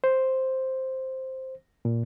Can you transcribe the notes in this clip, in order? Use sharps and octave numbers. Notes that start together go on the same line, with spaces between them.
C5
A#2